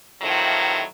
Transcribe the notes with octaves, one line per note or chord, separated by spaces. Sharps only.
A2 C3 D#3 F3 F#3